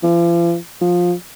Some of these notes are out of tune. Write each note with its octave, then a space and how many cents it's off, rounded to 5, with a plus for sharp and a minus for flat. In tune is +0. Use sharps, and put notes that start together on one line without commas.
F3 -45
F3 +15